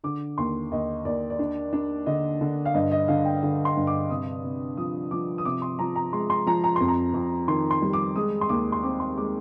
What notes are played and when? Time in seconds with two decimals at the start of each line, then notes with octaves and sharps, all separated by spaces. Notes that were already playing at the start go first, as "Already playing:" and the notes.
0.04 D3 D6
0.38 D#2 C6
0.71 D#2 D#5
1.05 D#2 D5
1.30 D5
1.39 D4
1.73 D4
2.06 D3 D#5
2.41 D3
2.65 F5
2.74 G2 D#5
2.91 D#5
3.08 D3 F5
3.25 G5
3.43 D3
3.65 C6
3.76 G2
3.87 D6
4.10 C3 D#6
4.44 C3
4.77 F3 D#6
5.11 F3 D6
5.38 D#6
5.45 C3 D6
5.62 C6
5.79 F3 A#5
5.96 A#5
6.12 G#3 C6
6.30 C6
6.46 F3 A#5
6.64 A#5
6.76 F2 C6
6.88 A#5
7.14 F2
7.48 D#3 C6
7.71 C6
7.82 G3
7.93 D6
8.16 G#3 D#6
8.41 C6
8.49 D#2 D6
8.72 C6
8.83 C4 D6
9.00 C6
9.17 G#3 D6